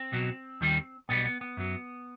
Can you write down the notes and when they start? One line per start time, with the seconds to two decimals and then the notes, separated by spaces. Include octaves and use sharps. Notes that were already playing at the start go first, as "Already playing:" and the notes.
Already playing: C4
0.12 B1 B2 F#3
0.61 D#2 D#3 G3
1.09 B1 B2 G3 B3
1.25 B3
1.41 B3
1.57 F#2 F#3